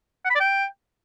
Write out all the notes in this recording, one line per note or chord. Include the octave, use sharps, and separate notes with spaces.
F#5
B5
D5
G5